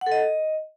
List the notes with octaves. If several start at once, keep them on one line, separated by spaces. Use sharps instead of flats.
F#5
A4
D#5